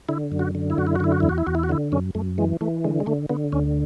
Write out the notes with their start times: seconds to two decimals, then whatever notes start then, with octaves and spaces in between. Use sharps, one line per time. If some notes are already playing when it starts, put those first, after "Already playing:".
0.09 D3 E4
0.32 F#2
0.39 F#4
0.55 D3
0.70 E4
0.78 F#2 F#4
0.87 E4
0.96 F#4
1.00 D3 E4
1.12 F#4
1.20 E2 E4
1.29 F#4
1.38 E4
1.46 E2 F#4
1.55 E4
1.63 F#4
1.69 D3 E4
1.92 F#2 C#4
2.15 F#2 A3
2.38 E3 G#3
2.61 E3 A3
2.84 D3 G#3
3.00 G#3
3.06 D3 A3
3.29 D3 B3
3.52 D2 C#4